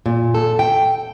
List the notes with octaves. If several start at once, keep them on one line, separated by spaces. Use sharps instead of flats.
A#2
A4
G5